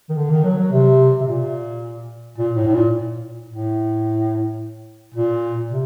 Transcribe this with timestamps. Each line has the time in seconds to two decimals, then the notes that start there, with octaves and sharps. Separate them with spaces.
0.09 D#3
0.16 D3
0.30 D#3
0.44 F#3
0.58 F#3
0.72 C3
1.21 C3
1.27 A#2
2.38 A#2
2.56 A2
2.67 A2
2.74 A#2
3.49 A2
5.14 A#2
5.70 C3